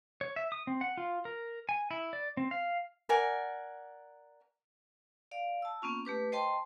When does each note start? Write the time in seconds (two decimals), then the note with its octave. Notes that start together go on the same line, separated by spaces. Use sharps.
0.21 C#5
0.36 E5
0.52 D#6
0.67 C4
0.81 F#5
0.97 F4
1.25 A#4
1.69 G#5
1.91 E4
2.13 D5
2.37 C4
2.51 F5
3.09 A#4 D5 F#5 G#5
5.31 D5 F5
5.62 A5 E6
5.82 A#3 B3 C#4 F4
6.05 A3 G4 B4 D6
6.32 C5 D#5 G5 A5 C6